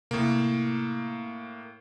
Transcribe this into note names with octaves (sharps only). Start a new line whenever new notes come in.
A2 C3 A#3